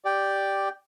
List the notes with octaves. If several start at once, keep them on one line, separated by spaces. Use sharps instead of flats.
G4 D5 G5